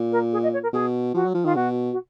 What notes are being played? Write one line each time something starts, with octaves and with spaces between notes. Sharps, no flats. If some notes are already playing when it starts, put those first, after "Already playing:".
Already playing: A#2
A#4
G#4
D#5
C#5
A#4
B2 G#4
F3 F#4
F#3
F3
D#3 F4
B2 F#4
F#4